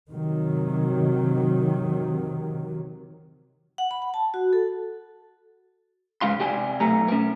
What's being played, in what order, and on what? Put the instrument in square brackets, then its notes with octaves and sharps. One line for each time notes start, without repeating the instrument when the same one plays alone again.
[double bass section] C3 D#3 F#3
[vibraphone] F#5
B5
F#5
A5
F#4
A4
[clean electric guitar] G2 C#3 G#3 F5 C6
C2 G3 G4 G#5
B1 A3 A#5
C#4 A#4